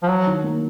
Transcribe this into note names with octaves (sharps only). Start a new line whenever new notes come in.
F3
F#3 F#4
D#3
A#3